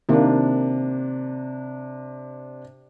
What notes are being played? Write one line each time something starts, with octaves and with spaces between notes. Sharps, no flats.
C3 D#3 A#3 D4